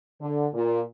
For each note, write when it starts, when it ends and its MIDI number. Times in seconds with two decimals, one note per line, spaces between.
0.21 0.47 50
0.53 0.80 46